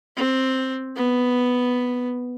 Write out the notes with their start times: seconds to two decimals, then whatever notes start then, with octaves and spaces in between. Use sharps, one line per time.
0.17 C4
0.96 B3